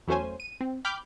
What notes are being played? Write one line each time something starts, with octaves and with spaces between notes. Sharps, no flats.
E2 F#3 A3 C#4 C5 G#5
D#7
C4
G5 B5 D6 F6 G6